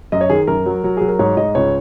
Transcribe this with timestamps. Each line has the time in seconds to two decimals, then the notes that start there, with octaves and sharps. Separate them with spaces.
0.12 F#2 D#5
0.21 C#5
0.30 D#3 G#4
0.47 F#2 A#4
0.66 F#3
0.84 F#3
0.97 F#3 G#4
1.08 A#4
1.19 G#2 C#5
1.37 G#2 D#5
1.55 C#2 C#5